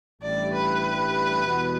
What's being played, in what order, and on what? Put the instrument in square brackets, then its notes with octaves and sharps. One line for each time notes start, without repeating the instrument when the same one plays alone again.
[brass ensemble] A1 G2 G3 E4 G4 [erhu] D5
[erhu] B4
[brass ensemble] E2 B2 G3 B3